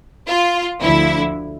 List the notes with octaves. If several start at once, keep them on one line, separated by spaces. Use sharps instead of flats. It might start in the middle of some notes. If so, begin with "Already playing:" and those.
F4
D2 D3 F3 E4